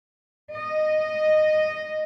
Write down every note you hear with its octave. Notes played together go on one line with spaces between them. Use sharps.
D#5